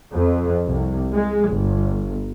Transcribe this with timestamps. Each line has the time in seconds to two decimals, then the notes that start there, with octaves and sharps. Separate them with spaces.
0.13 F2
0.66 C2
1.14 G#3
1.49 G1